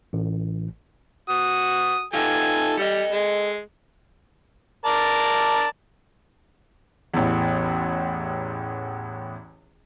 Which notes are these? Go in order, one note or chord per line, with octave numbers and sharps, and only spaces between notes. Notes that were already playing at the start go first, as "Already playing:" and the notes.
A1
F#4 D#6
D#4 F4 G4 A4 G#5
G3 A4 D#5
G#3
A#4 D5 A5
A1 E2